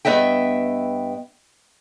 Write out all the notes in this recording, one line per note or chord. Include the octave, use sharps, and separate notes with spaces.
G2 B3 D#5 E5 G5